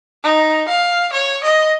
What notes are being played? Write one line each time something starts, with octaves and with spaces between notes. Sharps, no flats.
D#4
F5
C#5
D#5